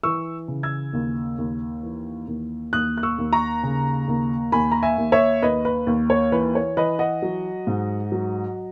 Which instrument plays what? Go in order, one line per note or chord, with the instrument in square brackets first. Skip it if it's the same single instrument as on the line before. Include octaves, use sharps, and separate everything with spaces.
[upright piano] E3 C#6 E6
C#3
E6 G#6
D#2
D#2
E3
D#2
D#2 D#6 F#6
F#6
C#6 E6
D#2
A#5 C#6
C#3
D#2
D#2 G#5 B5
A#5
E5 G#5
D#2
C#5 E5
D#2 B4 D#5
B4
D#2
C#5
E3 B4
C#5
E3 B4 D#5
D#5 F#5
F#3
G#2
F#3